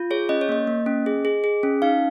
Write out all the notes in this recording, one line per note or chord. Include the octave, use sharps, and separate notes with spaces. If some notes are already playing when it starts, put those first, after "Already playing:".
Already playing: F4
G#4 C#5
C#4 D#5
C#5
A#3 D#5
A#3
C#4
G#4
G#4
G#4
C#4
D#4 F5